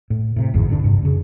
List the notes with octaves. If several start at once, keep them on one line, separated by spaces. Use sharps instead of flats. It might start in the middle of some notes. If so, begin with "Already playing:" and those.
A2
A2 C3
G#1 E2 G#2 D3
D#1 G2 D3 D4
G2 C3
F#2 C#3